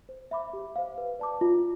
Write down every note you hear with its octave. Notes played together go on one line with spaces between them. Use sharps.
C5
E5 B5 D6
G4
C5 F5
B4
D5 A5 D6
F4